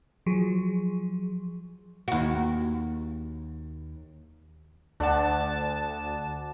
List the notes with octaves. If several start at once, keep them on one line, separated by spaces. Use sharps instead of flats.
F3 F#3 G#4
D#2 F#4
D2 D4 F#5 A5